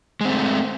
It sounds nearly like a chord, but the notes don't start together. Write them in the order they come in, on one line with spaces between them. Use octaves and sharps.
G#3 C4 A3